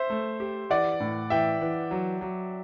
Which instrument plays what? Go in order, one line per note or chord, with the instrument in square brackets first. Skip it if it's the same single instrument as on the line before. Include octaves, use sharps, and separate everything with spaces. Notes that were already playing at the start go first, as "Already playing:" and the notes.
Already playing: [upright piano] C5 E5
[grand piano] A3
G4
[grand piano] E3 [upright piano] D5 F#5
[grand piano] A2
[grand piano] E3 [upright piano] E5 G5
[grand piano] E3
F#3
F#3